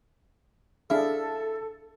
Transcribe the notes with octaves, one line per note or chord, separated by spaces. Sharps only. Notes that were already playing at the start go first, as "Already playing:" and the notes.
D4 E4 G#4 A4 F5